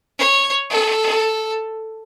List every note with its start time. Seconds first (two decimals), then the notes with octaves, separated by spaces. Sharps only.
0.19 C#5
0.70 A4